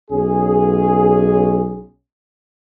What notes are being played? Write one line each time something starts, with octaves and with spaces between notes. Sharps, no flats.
B1 C#4 G#4